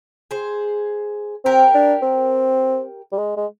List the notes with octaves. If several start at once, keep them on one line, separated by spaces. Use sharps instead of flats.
G#4 C5
C4 G4 A#4
D4
C4
G3
G#3
G#3